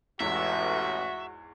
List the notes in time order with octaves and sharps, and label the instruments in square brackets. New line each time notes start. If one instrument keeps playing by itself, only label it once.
[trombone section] A1 [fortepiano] E2 G#2 C#5 [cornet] F#4 [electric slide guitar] E5